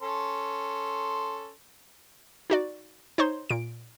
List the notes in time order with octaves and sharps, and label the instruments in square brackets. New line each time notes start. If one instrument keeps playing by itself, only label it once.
[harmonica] C#4 A4 C6
[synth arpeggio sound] D#4 F#4 D5
D#4 C5 C#5 C6
A#2 D7